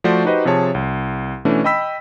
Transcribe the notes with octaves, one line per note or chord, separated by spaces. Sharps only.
F3 A3 F#4 C5 D5
D#4 F#4 G4 B4 C5 D#5
C3 F3 G#4 C#5 A5
C2
B2 E3 A3 C#4 D4
D#5 G5 B5 E6 B6